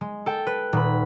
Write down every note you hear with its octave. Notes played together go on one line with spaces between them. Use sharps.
G#3
A4 G5
B4
D#1 B5